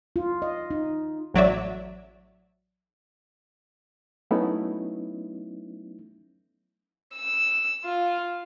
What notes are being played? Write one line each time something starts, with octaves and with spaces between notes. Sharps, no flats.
F4
D#5
D#4
A1 F#3 D5 E5
F#3 A3 B3 C#4 D#4 E4
E6
F4